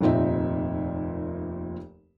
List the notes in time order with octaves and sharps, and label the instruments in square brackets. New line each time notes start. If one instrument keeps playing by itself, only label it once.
[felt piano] F1 D#2 A#2 C4 D#4 E5